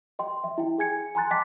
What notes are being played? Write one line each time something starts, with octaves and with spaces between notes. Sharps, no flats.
D#5 G5 C6
E5
E4 G5
G#4 G#5 G#6 C#7
G#5 A#5 C6 F#6 A6
D#5 G5 A5 D6 A6 B6